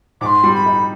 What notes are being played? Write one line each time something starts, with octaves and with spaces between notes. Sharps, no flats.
G#2 D6
C6
G3
B5
D#4